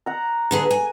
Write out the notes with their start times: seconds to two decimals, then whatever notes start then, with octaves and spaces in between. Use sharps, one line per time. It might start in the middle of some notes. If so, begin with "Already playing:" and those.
0.06 F#5 A#5
0.51 D3 B3 G#4
0.71 G#5